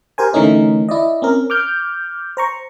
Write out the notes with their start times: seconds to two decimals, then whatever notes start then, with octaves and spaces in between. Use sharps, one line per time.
0.18 G4 A#4 C5 G#5
0.33 D3 E3 A3 C#4 D#4 A#4
0.89 E4 D5 D#5
1.22 C4 C#4 A#4
1.50 D6 F6 G6
2.37 C5 A#5 C#6